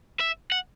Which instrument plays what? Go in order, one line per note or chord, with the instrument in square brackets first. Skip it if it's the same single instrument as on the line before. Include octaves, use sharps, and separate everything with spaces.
[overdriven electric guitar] E5
F#5